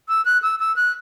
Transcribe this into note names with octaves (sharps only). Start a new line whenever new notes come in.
E6
F#6
E6
E6
F#6